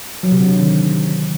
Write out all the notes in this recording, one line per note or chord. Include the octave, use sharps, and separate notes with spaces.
F#3
C3
D3
C3
D#3